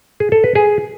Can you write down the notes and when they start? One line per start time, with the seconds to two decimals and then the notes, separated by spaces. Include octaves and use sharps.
0.20 G#4
0.32 A4
0.44 B4
0.55 G#4